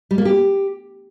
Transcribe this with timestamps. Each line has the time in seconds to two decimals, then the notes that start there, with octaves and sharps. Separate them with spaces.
0.11 G3
0.18 A#3
0.25 G4